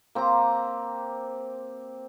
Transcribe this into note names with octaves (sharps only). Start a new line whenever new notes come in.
A#3 C4 G4 A#5